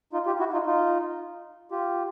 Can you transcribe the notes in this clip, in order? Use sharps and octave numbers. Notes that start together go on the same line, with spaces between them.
D#4 F4
F4 G4
E4 F#4
D#4 F4
D#4 F4
F4 G4